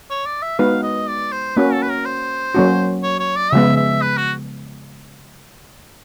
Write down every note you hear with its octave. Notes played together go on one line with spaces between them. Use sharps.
C#5
D5
E5
G#3 B3 D#4 F#4 B4 F5
D#5
D5
C5
A#3 C#4 F#4 B4
A4
B4
A#4
C5
F#3 A#3 C#4 F#4
C#5
C#5
D5
C#3 F3 G#3 B3 E5
E5
B4
F#4